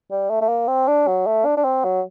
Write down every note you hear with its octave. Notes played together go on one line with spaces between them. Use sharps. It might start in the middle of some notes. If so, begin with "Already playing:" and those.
G3
A3
A3
A#3
C4
D4
F#3
A3
D4
D4
C4
F#3